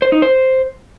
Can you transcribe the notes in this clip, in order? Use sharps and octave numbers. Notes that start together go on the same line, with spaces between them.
C5
D#4
C5